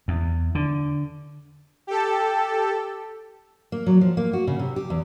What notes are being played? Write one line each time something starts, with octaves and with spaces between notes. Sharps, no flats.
E2
D3
G4 A4
A#3
F#3
F3
A#3
F#4
C#3
C3
G4
E2